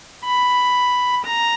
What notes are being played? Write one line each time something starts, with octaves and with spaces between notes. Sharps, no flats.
B5
A#5